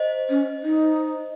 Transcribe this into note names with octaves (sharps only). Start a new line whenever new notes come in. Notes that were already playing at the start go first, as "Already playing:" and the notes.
Already playing: C5 D#5
C#4
D#4